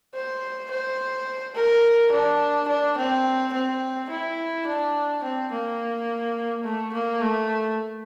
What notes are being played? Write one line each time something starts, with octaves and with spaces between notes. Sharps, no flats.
C5
C5
A#4
D4
D4
C4
C4
E4
D4
C4
A#3
A3
A#3
A3